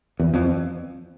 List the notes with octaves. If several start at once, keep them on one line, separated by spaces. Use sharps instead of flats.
E2
F2